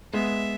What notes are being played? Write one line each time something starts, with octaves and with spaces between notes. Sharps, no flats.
G#3 B3 E5